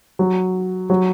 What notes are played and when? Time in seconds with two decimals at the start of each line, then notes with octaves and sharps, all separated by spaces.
0.19 F#3
0.90 F#3